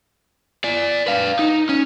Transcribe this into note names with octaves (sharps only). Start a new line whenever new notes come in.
D5 G#5
B4 F5
D#4
C#4